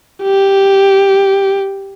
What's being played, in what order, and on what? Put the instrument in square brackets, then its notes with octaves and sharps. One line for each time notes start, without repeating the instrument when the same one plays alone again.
[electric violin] G4